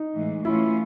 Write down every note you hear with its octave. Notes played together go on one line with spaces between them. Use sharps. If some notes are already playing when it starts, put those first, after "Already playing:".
Already playing: D#4
A2 E3 G#3
E3 A3 C#4 E4 F4